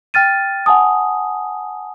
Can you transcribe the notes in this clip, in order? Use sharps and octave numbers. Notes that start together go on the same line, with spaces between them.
G5 F6 A6 D#7
F#5 G#5 A5 D#6